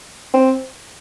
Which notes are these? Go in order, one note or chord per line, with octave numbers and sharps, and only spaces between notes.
C4